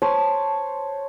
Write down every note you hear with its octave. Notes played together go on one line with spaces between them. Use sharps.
C5 C#5 A5 C6